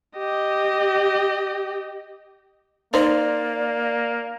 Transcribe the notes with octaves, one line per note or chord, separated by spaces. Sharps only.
G4 D#5
A#3 D#4 C5 D5